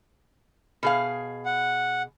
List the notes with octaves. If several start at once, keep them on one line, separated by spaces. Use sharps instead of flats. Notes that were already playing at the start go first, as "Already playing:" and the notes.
B2 G#4 F5
F#5